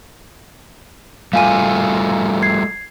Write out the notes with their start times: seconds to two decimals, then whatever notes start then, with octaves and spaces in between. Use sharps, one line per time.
1.33 G3 A3 F4 F5 G#5 D#7
2.43 G#6 C7